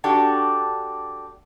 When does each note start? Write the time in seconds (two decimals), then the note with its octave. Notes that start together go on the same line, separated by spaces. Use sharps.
0.04 D4 F#4 G4 A4